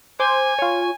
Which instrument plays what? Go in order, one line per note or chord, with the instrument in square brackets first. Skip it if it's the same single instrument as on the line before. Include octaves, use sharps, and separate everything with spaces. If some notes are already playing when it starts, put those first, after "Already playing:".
[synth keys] C5 D6 G6 [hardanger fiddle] G#5
[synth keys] F4 C#5